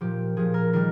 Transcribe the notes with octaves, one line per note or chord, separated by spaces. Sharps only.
A#2 F3 G4
A#2 F3 G#4
A#4
D#3 G3 A#4